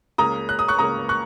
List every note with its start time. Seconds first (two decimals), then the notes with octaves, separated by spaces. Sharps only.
0.18 C#2 C#3 A#3 A#5 D#6
0.49 F#6
0.59 D#6
0.68 C#6 F#6
0.79 C#2 C#3 A#3 A#5 D#6
1.09 C#6 F#6